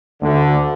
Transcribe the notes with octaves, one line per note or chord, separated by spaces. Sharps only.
D2 D3